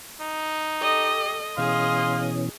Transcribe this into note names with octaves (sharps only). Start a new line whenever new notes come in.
D#4
G4 A4 D#5
B2 E3 C#4 G#4 D#5 F5 C6